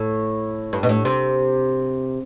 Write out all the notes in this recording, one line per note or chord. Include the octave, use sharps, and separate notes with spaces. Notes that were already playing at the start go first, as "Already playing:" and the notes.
Already playing: A2
G2
B2
A2
C3